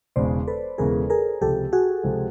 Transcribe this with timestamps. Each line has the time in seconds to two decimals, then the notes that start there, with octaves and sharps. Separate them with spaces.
0.16 E1 E2 C#3 E3 G#3 C5 D5
0.48 A4 B4
0.78 E1 E2 C#3 E3 G#3 G#4 A#4
1.10 G#4 A#4
1.41 C#2 C3 F3 G#3 C4 G4 A4
1.73 F#4 G#4
2.03 C#2 C3 F3 G#3 C4